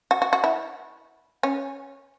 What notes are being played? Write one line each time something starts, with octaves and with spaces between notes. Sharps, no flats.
F#4
F#4
F#4
E4
C#4